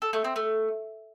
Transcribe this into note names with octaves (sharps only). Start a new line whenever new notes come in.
A4
A3
C4
A3